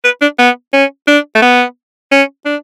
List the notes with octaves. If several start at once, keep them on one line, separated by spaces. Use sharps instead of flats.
B4
D4
B3
C#4
D4
A3
B3
C#4
D4